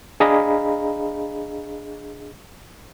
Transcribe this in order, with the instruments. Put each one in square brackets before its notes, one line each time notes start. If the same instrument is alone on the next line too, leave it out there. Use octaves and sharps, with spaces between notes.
[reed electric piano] D4 G#4 D#5 F5 A#5 B5